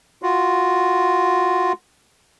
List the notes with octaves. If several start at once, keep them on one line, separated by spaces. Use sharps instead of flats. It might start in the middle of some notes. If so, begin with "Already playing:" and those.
F4 F#4